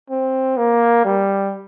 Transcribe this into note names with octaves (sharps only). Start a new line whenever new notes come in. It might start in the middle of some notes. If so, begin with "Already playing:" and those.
C4
A#3
G3